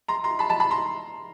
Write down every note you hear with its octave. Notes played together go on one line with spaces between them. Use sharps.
A#5 C6
A#5 C6
A5 B5
A5 B5
A5 B5
A#5 C6